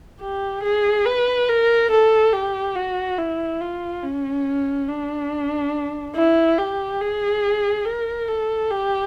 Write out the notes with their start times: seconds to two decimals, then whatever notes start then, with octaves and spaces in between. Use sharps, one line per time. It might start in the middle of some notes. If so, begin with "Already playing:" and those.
0.21 G4
0.63 G#4
1.05 B4
1.48 A#4
1.91 A4
2.33 G4
2.76 F#4
3.18 E4
3.61 F4
4.03 C#4
4.88 D4
6.15 E4
6.58 G4
7.01 G#4
7.85 A#4
8.28 A4
8.70 G4